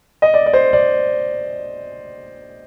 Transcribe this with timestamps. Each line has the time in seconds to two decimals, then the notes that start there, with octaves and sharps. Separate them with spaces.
0.22 D#5
0.34 D5
0.46 D5
0.54 C5
0.73 D5